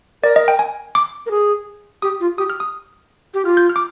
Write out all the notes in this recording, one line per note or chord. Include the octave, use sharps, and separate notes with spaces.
A#4 D5
D#5
G5
G#5
D6
A#4
G#4
G4 D#6
F4
G4 D#6
F6
D#6
G4
F4 F6
G6
F6
D6